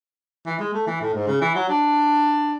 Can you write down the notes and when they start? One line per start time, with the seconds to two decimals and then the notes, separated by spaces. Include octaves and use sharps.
0.46 E3
0.59 G#3
0.73 A3
0.87 E3
1.01 A2
1.14 G#2
1.27 C#3
1.41 E3
1.55 F#3
1.68 D4